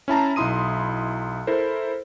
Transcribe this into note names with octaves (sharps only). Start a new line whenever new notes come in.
C#4 E4 A5 A#5
B1 D#4 E4 C6 D#6 D#7
E4 A4 A#4 C5